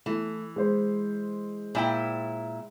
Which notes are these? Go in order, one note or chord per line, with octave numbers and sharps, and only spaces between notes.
E3 A3 E4
G#3 C5
A#2 E4 G5